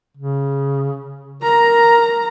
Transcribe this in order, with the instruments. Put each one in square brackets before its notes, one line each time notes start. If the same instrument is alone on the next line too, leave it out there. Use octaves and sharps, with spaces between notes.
[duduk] C#3
[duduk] A#4 [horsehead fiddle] A#5